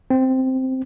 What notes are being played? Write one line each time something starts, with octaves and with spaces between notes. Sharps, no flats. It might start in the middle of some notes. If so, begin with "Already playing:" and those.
C4